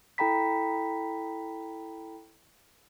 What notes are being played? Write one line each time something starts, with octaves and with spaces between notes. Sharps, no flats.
E4 A4 G5 A#5 B5 B6